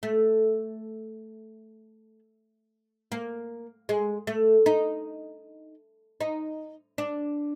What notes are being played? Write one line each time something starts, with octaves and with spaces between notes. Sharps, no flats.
A3
A#3
G#3
A3
D#4
D#4
D4